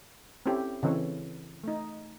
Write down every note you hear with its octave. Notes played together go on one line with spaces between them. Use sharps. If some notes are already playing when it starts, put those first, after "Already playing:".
C4 C#4 E4 G4 A4
C#3 E3 C4 A4 C#5
A3 D#4